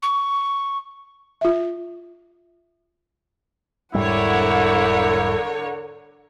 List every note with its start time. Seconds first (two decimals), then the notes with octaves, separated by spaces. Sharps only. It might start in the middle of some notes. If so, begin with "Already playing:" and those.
0.03 C#6
1.41 F4 E5
3.95 E1 G#2 D3 G3 E4 A#4 C#5 F#5